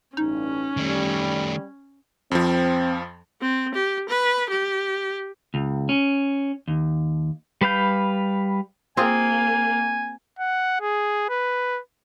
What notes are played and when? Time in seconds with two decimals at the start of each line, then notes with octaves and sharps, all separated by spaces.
0.17 A1 G2 C#4 D#4
0.77 D#3 G3 A3
2.31 F2 F3 C4
3.41 C4
3.74 G4
4.09 B4
4.49 G4
5.54 C#2
5.89 C#4
6.68 D#2
7.61 G3 B4 F5 G6
8.97 A#3 C4 F4 G#4 G#5
10.39 F#5
10.81 G#4
11.29 B4